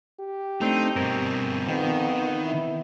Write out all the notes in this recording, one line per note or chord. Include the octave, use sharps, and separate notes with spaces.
G4
A3 C4 D4 D#4
G2 B2 C4 A#4
F2 D#3 B3
E4